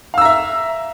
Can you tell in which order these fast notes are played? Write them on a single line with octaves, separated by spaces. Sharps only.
F5 E6 A#5 E5